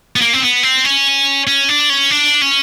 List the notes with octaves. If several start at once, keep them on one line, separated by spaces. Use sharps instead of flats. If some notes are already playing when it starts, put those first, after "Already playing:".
B3
A#3
C4
B3
C4
C#4
C#4
D4
C#4
D4
C#4